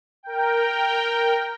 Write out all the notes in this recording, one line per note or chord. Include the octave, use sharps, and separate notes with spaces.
A#4 G5